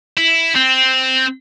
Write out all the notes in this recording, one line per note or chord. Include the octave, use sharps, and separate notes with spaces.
E4
C4